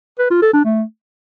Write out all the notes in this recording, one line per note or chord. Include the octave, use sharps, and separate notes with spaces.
B4
F4
A4
D4
A3